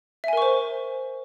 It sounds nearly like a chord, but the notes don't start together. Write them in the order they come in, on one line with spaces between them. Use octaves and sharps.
E5 G#5 A#4 C#6 C5